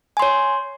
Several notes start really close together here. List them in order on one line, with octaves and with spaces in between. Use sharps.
G#5 C6 C#5